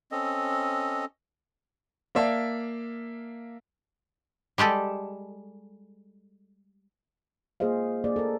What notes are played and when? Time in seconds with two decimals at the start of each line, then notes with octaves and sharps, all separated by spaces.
0.12 C4 C#4 A4 D#5
2.15 A#3 D5 E5 F5 A5
4.58 G3 G#3 G4 A4
7.60 A#3 F4 G#4 C5 D#5 F5
8.04 A#3 G#4 D5
8.16 A4 A#4